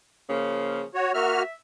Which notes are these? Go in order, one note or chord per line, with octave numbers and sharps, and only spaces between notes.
C#3 F3 A#3
F#4 C#5
A#3 F#4 E5 F6